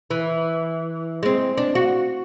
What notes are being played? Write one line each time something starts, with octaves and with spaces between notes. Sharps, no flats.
E3
G#3 C4
D4
F#4